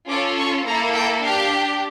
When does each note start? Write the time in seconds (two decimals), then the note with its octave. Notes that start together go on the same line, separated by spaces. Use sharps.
0.09 C#4 F4 A4 D6
0.38 C#6
0.66 A#3 E4 A4 A#5
0.95 G5
1.23 D4 G4 F5